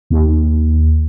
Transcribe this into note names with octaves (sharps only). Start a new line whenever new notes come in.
D#2